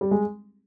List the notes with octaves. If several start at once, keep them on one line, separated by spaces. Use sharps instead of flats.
G3
G#3